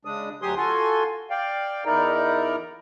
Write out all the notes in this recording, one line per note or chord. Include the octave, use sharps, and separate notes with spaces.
C#3 G#3 D4 D#6
D2 F#3 G4 G#5 C6 D#6
F4 F#4 A4 G#5 C6
D5 F5 G5
E2 D#4 E4 A#4 D5 A#5